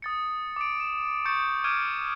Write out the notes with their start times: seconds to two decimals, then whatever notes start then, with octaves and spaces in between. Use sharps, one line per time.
0.02 D#6 A6 C#7
0.56 D6 D7
0.80 E7
1.25 C#6 D#6 G6 A6 C#7 E7
1.64 D6 F6 G#6 D7 D#7